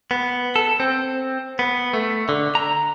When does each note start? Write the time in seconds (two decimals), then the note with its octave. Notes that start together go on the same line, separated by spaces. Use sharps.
0.11 B3
0.56 A4
0.80 C4
1.59 B3
1.93 A3
2.29 D3
2.55 A#5